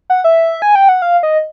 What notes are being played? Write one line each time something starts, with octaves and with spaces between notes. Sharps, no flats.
F#5
E5
G#5
G5
F#5
F5
D#5